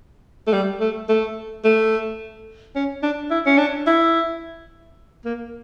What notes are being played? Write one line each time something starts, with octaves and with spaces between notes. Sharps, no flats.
A3
G3
A3
A3
A3
C#4
D4
E4
C#4
D4
E4
A#3